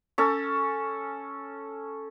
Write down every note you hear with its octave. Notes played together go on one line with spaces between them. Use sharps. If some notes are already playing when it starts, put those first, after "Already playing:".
C#4 A4